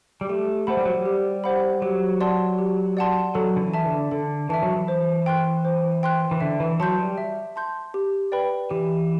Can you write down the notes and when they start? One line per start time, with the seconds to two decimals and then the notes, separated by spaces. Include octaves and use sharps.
0.21 G3
0.29 A3 G4
0.67 A3 C5 F#5 B5
0.77 G3
0.85 F#3
0.94 G3
1.06 G4
1.44 C5 F#5 B5
1.82 F#3 G4
2.21 D5 F#5 A5 C6
2.59 G4
2.97 D5 F#5 A5 C6
3.35 F#3 A4
3.56 D3
3.61 E3
3.74 E5 A5
3.86 D3
4.11 D3 A4
4.49 E3 E5 A5
4.63 F#3
4.76 E3
4.88 C5
5.26 G5 C6 F#6
5.65 C5
6.03 G5 C6 F#6
6.31 E3
6.41 D3 E5
6.60 E3
6.80 F#3 A5 C6 G6
6.98 G3
7.18 E5
7.56 A5 C6 G6
7.94 G4
8.32 B4 D5 G5 B5
8.70 E3 G4